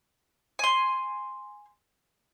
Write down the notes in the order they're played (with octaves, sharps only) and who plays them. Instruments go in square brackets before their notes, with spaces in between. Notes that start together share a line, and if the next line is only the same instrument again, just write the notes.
[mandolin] G#5 C6